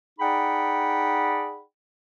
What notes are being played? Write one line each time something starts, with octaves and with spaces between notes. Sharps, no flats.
D#4 G#4 D5 F#5 G5 B5